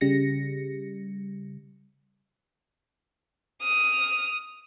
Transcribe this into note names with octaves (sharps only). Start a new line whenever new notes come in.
C#3 G3 A#6 C#7
D#6 F6